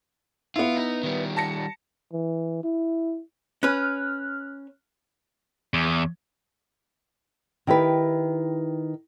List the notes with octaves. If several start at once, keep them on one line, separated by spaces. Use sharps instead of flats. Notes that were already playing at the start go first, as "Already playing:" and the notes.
B3 E4 F4
D#4
D#3 G3
A5 A#6 C#7
E3
E4
C#4 B4 F6 F#6
E2
D#3 E4 G4 B4